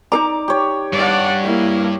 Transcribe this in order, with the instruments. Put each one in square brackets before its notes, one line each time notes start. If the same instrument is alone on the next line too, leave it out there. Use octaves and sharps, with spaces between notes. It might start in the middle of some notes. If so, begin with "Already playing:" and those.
[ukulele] D#4 G#4 A#5 [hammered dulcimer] D5
[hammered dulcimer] G4 C#5
[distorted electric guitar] G2 [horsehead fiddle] D5 F#5
[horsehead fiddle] A#3 E4